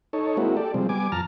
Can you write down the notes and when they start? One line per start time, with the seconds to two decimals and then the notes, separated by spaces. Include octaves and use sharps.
0.13 D#4 A4 C#5
0.37 G#3 A#3 C4 E4 F#4
0.57 G4 A4 D5
0.74 C3 F3 G3 G#3 C4
0.89 G3 B3 G#5 D6
1.12 F2 A5 A#5 F6